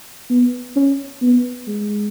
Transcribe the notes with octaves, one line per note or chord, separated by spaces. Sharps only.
B3
C#4
B3
G#3